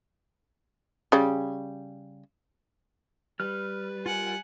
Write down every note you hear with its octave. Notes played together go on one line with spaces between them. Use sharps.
C#3 G3
G3 B4 F6
F4 A#4 F#5 G#5